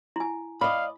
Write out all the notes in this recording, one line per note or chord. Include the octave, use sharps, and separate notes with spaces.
E4 G#5
D5 D#5 F5 B5